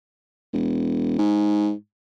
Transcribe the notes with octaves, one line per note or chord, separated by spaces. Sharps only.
E1
G#2